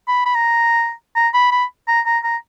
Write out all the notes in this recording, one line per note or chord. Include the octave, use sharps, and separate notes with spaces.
B5
B5
A#5
A#5
B5
B5
A#5
A#5
A#5